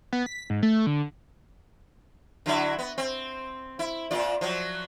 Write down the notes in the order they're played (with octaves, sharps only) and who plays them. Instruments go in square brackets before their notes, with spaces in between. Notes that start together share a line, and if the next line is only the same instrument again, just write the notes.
[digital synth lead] B3
B6
G#2
A3
D3
[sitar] D3 F#3 E4
B3
C4
E4
A#2 F4 D5
F3 F#3